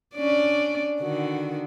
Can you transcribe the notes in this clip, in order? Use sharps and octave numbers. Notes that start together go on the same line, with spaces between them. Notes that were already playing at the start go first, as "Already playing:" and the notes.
C#4 D4 D5
D3 D#3 F#4